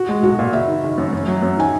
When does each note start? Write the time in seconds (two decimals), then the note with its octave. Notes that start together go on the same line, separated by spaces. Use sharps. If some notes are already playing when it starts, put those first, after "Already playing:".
Already playing: F#4
0.09 G#3
0.23 B1 F#4
0.39 A#2
0.53 F#1 E5
0.68 D#3
0.84 F#1
0.98 F#2
1.13 F#2
1.28 F#3
1.42 F#2
1.57 D#3 G#5